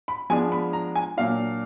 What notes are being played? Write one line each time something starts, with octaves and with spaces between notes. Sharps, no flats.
B5
F3 G#3 B3 D4 G#5
B5
A#5
G#5
A#2 F#3 A#3 D4 F5